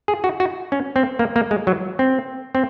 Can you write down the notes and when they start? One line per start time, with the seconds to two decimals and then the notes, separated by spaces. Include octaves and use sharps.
0.08 G#4
0.24 F#4
0.40 F#4
0.72 C#4
0.96 C4
1.19 A#3
1.36 A#3
1.51 G#3
1.67 F#3
1.99 C4
2.55 C4